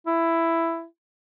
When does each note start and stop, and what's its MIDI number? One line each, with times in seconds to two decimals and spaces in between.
0.07 0.84 64